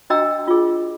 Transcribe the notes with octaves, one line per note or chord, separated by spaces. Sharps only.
D4 F#4 D#5 G5 A#5 E6
F4 G#4